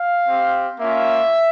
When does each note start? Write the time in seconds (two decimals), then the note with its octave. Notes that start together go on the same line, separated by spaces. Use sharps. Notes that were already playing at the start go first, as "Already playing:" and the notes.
Already playing: F5
0.27 C4 G4
0.79 A#3 C#4 F4 E5